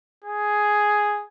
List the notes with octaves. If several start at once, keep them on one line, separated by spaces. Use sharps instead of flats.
G#4